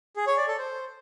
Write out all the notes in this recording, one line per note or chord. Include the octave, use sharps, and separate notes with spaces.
G#4
C#5
D5
A4
C5